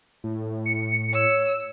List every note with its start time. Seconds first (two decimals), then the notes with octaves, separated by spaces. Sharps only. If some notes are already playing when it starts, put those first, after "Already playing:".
0.24 A2
0.66 C#7
1.13 C#5 E6